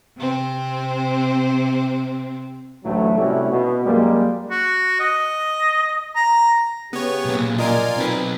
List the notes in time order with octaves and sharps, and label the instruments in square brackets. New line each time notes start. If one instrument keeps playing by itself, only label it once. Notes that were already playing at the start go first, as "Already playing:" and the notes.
[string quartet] C3 C4
[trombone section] A1 D2 A2 F#3 A3
C3 G3 A3 C#4 E4 F#4
B2
F#2 G3 G#3 A#3
[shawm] F#4
D#5
A#5
[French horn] C#3 [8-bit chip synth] B3 C#5 [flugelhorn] G4
[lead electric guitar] B1 A#2
[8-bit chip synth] F4 A#4 G#5 [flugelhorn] D5 [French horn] D#5
[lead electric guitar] B1 B4 [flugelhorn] C4 [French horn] D#4